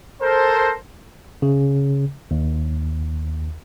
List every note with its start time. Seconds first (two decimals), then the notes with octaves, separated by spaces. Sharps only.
0.22 A4 A#4 C5
1.42 C#3
2.31 D#2